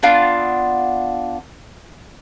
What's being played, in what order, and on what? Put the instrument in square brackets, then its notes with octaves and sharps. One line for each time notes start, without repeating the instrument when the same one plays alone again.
[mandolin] B3 D4 F4